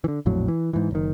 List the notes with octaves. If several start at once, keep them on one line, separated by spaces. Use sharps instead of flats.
D3 E3
A#1 F2 A2 F#3
E3
G#2 E3
F#1 D#3